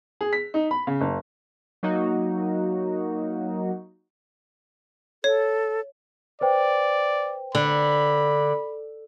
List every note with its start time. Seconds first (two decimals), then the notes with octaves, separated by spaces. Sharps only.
0.21 G#4
0.33 B6
0.54 D#4
0.71 B5
0.87 C#3
1.01 F#1
1.83 F#3 A#3 D#4 F#4
5.24 A4 C#5
6.41 B4 C5 D5 G5
7.55 D3 B5